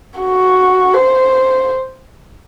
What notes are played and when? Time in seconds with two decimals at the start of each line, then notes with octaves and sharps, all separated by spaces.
0.20 F#4
0.94 C5